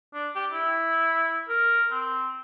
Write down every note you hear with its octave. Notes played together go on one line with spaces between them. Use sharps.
D4
G4
E4
A#4
C4